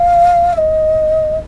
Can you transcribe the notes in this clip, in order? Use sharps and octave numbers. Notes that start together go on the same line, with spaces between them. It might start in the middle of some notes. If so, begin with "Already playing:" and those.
Already playing: F5
E5
D#5